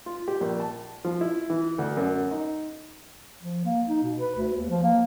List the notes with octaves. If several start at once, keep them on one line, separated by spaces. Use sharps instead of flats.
F4
G4
A#1
A5
F3
E4
E3
D2
F#2
D#4
F3
A#3
D#4
B2
B4
D2
D#2
F3
A#3